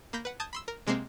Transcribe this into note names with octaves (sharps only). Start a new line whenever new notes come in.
A#3 B5 G6 A#6
B4 F#5
A5 D#6 G6 G#6
B5 C6 E6
A#4
C3 G#3 A#3 C4